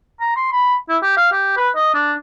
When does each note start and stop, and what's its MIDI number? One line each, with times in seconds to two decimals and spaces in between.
0.20 0.36 82
0.36 0.50 84
0.52 0.75 83
0.89 0.97 64
1.03 1.15 67
1.17 1.32 77
1.32 1.56 67
1.57 1.69 71
1.76 1.93 75
1.94 2.13 62